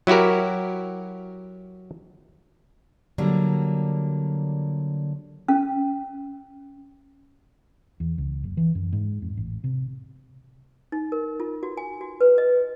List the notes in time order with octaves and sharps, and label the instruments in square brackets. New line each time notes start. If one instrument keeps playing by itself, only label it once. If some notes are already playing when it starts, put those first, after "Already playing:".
[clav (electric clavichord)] F#3 E4 F#4 G4 A#4
[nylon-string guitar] D3 F#3 G3 A#3
[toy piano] C#4
[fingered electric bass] E2
C#2
F#1
E3
F#2
G#2
F2
A1
C3
[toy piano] D#4
A#4
F4
F#4
G#5
F#4
B4
D#5